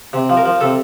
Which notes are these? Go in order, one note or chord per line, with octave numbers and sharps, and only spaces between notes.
C3
F3
A#4
F3
C3 A4